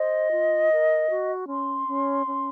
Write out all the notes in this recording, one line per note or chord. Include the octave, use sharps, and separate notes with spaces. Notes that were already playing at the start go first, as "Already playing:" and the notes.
Already playing: C5 D#5
F4
A#4
F#4
C#4 C6
C#4
C#4